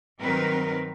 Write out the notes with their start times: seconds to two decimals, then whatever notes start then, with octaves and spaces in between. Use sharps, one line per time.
0.20 G2 D#3 F#3 C4 A#4 B4